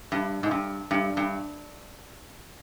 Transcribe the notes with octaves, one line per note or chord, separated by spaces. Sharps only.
G2
G#2
G2
G2
G2